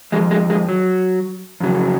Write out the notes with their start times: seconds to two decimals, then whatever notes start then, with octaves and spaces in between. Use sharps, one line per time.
0.12 F2 F3 G#3
0.31 G#3
0.50 G#3
0.69 F#3
1.60 F2 C#3 F#3